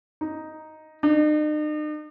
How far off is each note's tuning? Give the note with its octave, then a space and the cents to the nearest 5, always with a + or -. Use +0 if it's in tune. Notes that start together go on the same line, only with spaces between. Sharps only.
D#4 +0
D#4 -45